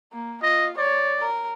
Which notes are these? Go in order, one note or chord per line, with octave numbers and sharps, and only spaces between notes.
A#3
F4 D#5
C#5 D5
A#4